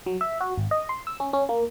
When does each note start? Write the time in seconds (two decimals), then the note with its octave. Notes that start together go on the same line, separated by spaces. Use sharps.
0.06 F#3
0.21 E5
0.41 F#4
0.58 G#1
0.71 D#5
0.89 C6
1.07 E6
1.20 C#4
1.33 C#4
1.49 A#3